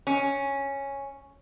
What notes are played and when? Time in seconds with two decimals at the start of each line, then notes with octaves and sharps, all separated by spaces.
0.07 C#4